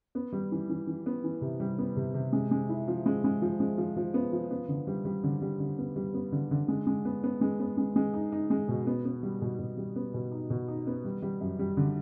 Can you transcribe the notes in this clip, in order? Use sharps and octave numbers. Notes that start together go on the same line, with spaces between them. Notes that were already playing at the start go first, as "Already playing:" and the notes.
B3
G3
E3
E3
E3
B3
E3
C3
G3
B3
C3
C3
G#3
G#3
E4
F3
G#3
G#3
F3
G#3
F3
F3
B3
F3
B3
D3
G3
G3
D3
G3
D3
B3
G3
B3
D3
D3
G#3
G#3
B3
B3
G#3
B3
G#3
G#3
D#4
D#4
G#3
B2
B3
B3
G3
B2
B2
G3
B3
B2
D#4
B2
D#4
B3
G3
G3
F#2
G3
D3